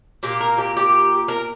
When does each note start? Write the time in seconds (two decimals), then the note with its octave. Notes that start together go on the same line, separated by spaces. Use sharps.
0.23 A#2 A#3 G4
0.40 A#4
0.58 G4
0.77 G4
1.28 A#4